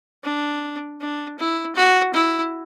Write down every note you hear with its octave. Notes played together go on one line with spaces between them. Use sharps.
D4
D4
E4
F#4
E4